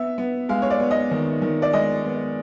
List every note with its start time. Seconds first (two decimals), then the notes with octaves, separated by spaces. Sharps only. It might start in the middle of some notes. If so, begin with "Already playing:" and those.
Already playing: B3 E5
0.18 B3
0.49 G#3 F5
0.62 C#5
0.70 D5
0.80 B3
0.91 D#5
1.11 D#3
1.42 D#3
1.62 D5
1.73 G#3 D#5
2.04 B3